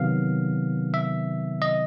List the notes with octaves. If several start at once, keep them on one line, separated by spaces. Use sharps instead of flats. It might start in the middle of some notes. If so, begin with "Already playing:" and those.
Already playing: C3 D#3 F#3 B3 F5
E5
D#5